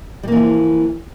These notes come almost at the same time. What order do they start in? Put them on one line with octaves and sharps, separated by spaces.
G3 A#3 E3 F3